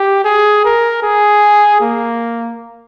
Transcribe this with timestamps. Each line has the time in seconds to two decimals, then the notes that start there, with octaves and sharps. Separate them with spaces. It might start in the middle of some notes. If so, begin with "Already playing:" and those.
Already playing: G4
0.25 G#4
0.64 A#4
1.02 G#4
1.81 A#3